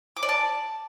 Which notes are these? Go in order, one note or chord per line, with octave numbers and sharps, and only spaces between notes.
D6
D5
A5